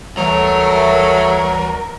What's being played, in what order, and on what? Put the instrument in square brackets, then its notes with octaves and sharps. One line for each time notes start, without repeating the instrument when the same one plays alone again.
[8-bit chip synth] D2 E3 G3 [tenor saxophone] F#3 [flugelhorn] A3 [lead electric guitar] A#4